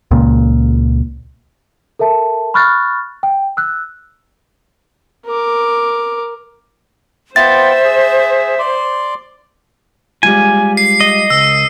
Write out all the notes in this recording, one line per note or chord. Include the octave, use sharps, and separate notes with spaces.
C#2 A#2
A4 A#4 E5 A5
B5 C#6 F6 F#6 A6
G5
E6 F#6
A#4 D6
B3 F4 C5 E5 G5 A6
G#4
D5 C6
G3 G#3 F4 G#5
C7
D#5
C#2 E6